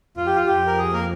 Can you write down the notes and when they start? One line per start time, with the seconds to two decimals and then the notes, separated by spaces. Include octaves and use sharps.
0.16 F2 F4
0.26 G4
0.36 F4
0.46 F2 G4
0.67 A#4
0.78 G#4
0.93 A#3 A#4